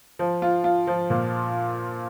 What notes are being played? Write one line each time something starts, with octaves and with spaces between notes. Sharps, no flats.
F3
F4
F4
F3
A#2